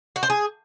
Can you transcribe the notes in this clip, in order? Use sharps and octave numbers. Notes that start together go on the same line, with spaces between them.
F#4
C5
G#4